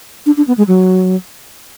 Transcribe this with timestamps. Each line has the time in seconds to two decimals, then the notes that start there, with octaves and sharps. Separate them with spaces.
0.26 D4
0.37 D4
0.48 B3
0.58 G#3
0.68 F#3